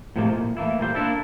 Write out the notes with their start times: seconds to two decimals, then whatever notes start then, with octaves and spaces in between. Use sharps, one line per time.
0.16 A2 C3 F3 G3 G#3 A#3
0.34 A#2
0.57 E3 A3 A#3 E4
0.80 A#2 G3 C5
0.94 A#3 D4 E4 A4 A#4